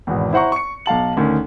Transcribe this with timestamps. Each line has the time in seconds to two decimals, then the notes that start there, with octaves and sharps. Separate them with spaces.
0.07 G#1 E2 B2
0.33 E4 C5 F#5 A#5 C#6
0.52 C#6 C#7
0.86 B1 F5 A5 F#7
1.17 D2 D#3 C#4